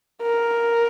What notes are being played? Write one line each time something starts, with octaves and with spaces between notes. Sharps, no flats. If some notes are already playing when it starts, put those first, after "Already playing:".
A#4